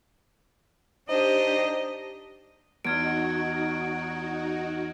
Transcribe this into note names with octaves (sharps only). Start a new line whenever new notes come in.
D4 D#4 G4 C5 D#5
E2 D#4 F#4 F6 G#6 D7